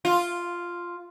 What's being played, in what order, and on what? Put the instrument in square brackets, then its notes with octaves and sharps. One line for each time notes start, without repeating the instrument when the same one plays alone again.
[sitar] F4